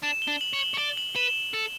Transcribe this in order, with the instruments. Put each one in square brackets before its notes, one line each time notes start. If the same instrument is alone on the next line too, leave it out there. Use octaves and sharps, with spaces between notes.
[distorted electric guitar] D4 [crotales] E7
[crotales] G7
[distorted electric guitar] D4
[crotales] F#7
[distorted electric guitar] C#5
[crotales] F#7
[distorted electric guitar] C#5
[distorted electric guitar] D5 [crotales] G7
[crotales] F#7
[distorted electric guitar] B4 [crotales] E7
[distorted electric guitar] A4